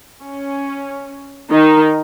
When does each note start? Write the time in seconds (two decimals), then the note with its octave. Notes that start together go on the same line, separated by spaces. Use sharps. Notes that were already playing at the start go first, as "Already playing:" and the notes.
0.21 C#4
1.50 D#3 D#4